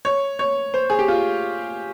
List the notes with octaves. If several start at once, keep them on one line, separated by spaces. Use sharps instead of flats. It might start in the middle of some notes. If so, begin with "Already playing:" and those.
C#5
C#5
C5
G#4
G4
F4